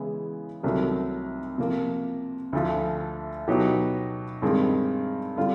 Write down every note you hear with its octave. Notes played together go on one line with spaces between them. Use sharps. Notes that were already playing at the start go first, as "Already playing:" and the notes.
Already playing: C#3 E3 G#3 B3 E4
C2 C3 D#3 F#3 A3
C3 F3 A#3
D2 D3 F3 A3
B2 F#3 B3 D#4 G4
G2 D#3 G#3 C4
D3 G3 C4 F4